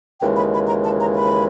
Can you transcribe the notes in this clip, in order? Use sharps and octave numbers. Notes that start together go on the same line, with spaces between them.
D#2 C#3 E3 G#3 G5
B5
B5
A#5
A5
A#5
B5